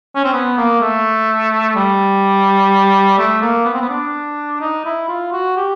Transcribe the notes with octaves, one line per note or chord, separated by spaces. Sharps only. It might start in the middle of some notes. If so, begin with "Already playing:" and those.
C#4
C4
B3
A#3
A3
G3
A3
A#3
B3
C4
B3
D4
D#4
E4
F4
F#4
G4